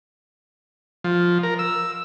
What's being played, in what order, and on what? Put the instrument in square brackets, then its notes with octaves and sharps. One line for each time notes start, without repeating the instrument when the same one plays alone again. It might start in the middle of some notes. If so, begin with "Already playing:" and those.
[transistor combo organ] F3
A#4
E6